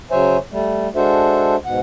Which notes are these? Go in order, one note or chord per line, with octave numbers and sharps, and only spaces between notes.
C#3 F#3 C5 C#5 E5 G#5
G3 A3
G#3 D4 F#4 A4 C5 E5
G#2 B2 F#5